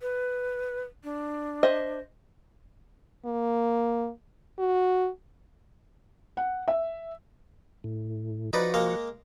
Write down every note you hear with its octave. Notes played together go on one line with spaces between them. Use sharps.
B4
D4
C5 D#5 E5
A#3
F#4
F#5
E5
A2
F3 D#4 F#4 B4 D5
G#3 A#3 F5